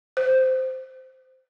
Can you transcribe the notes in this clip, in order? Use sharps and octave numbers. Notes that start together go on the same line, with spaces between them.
C5